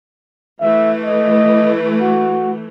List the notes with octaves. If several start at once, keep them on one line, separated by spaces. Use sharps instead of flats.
E3 A3 E5
D#5
F#4